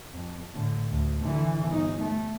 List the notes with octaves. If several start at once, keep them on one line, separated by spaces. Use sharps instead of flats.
F2
A2 D3
D2
D3 E3
G1 D#4
A3